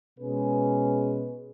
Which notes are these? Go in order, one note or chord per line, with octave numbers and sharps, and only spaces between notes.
B2 G#3 C#4 G#4 B4